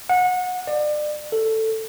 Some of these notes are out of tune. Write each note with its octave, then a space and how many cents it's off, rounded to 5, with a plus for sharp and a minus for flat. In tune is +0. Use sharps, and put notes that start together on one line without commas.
F#5 -25
D5 +35
A4 +10